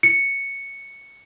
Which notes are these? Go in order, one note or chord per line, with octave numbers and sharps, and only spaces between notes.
C#7